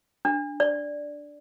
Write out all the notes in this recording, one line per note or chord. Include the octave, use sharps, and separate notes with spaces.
D4
D5